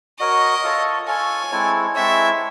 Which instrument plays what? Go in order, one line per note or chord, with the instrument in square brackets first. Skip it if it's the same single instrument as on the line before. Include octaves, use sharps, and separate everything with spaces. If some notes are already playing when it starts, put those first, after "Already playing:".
[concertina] F#4 A#4 C#5 [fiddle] D#5
[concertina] F4 A4 C#5
[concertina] F4 A4 C#5 [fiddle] G#5
[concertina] G#3 C4 E4 A4 C#5
[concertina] G#3 C4 E4 A4 C#5 [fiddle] E5